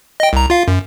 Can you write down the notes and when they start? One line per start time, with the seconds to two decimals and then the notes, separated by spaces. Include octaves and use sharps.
0.20 D#5 G5
0.33 C2 A#5
0.50 F4 F5
0.68 F#2